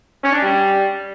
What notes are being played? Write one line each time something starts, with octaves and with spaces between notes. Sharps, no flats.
C#4
D4
G3